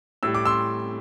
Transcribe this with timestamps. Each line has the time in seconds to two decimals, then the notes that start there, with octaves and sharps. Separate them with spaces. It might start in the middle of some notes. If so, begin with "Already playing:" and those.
0.23 A2 G3 E6
0.35 D6
0.45 C6 E6